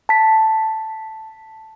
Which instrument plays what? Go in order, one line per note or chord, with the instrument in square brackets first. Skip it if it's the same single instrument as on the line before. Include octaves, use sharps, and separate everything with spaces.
[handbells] A5 B6